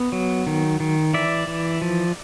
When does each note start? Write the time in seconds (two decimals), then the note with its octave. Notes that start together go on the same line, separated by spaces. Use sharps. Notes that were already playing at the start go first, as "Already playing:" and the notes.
Already playing: B3
0.12 F#3
0.47 D#3
0.80 D#3
1.14 E3 D5 E5
1.47 E3
1.82 F3